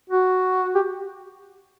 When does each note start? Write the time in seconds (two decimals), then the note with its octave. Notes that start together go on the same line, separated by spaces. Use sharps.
0.10 F#4
0.75 G4